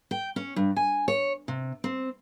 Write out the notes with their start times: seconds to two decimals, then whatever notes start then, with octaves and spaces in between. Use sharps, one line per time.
0.11 G5
0.36 C#4
0.56 G2
0.76 G#5
1.08 C#5
1.48 C3
1.84 C4